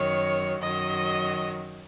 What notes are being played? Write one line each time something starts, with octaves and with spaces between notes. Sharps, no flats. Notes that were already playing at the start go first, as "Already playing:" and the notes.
Already playing: F#2 D#3 F#3 C#5
F#2 D#3 F#3 D#5